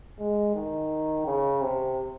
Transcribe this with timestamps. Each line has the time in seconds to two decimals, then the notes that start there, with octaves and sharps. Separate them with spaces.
0.19 G#3
0.55 D#3
1.26 C#3
1.62 C3